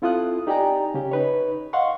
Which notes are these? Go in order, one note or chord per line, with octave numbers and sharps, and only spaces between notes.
C4 E4 F4 A4 D#6 F#6
D#4 G4 D5 G5 G#5 A#5
C#3 C#4 G4
D#4 B4 C#5
D#5 F5 F#5 C6 C#6